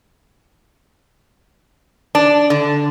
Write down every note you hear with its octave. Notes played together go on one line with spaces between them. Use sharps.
D4
D3